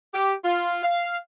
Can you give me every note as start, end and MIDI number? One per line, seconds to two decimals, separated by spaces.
0.14 0.33 67
0.44 0.79 65
0.84 1.16 77